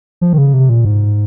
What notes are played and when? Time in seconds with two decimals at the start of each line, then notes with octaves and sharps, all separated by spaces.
0.21 F3
0.33 D#3
0.38 C#3
0.54 C3
0.69 A#2
0.85 G#2